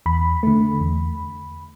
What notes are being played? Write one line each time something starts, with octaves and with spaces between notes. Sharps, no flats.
E2 B5
D3 A3
E2